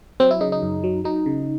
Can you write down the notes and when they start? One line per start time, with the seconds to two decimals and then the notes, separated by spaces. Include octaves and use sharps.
0.20 F#3 C4
0.31 E4
0.41 C#3 D#4
0.52 D#4
0.62 F#2
0.84 F#3
1.04 F#3 D#4
1.26 C#3